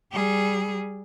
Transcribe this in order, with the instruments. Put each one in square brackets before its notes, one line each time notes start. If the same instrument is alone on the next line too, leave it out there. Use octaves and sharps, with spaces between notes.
[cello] G3 G#4